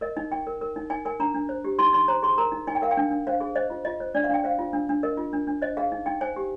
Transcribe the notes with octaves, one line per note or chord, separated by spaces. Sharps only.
A#4 D#5
D#4
D#4 G5
A#4
A#4
D#4
D#4 G#5
A#4 G#5
D4 A#5
D4
C5
G4
D#4 C6
D#4 C6
C5 A#5
G#4 C6
A#4 A#5
D#4
D#4 G#5
G5
A#4 F5
G5
D4
D4
C5 F5
G#4
C5 D#5
F4
F4 D#5
C5
D4 D5
F5
D4 G5
C5 F5
F4
D4
D4
A#4 D#5
F4
D4
D4
C5 D#5
G#4 F5
D#4
D#4 G5
C5 G#5
G4